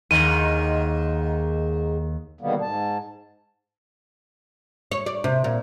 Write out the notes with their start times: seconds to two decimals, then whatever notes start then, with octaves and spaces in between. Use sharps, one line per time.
0.11 D#2 G#2 D#3 D#7
2.41 B2 D3 D#3 G3 A#3 B3
2.61 G#2 A5
4.91 C#5
5.06 D5
5.24 C3
5.44 A#2